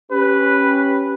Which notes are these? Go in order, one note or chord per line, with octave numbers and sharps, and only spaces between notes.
C#4 G4 B4